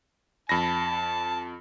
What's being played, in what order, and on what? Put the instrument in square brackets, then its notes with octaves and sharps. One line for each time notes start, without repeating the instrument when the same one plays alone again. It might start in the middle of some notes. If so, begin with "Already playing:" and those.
[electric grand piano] F2 B5 A#6 [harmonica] A5